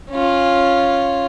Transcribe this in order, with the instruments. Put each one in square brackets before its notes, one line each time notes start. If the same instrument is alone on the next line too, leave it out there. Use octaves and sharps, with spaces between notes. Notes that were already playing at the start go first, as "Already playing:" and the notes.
[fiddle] C#4 F4